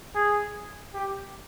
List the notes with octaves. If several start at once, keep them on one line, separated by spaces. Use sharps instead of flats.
G#4
G4